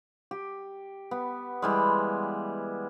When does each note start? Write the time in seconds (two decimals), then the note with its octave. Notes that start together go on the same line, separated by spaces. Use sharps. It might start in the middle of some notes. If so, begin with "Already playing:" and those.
0.31 G4
1.11 B3
1.62 E3 G3 G#3